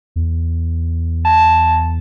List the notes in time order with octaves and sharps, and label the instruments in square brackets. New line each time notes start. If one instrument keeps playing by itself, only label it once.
[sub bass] E2
[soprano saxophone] A5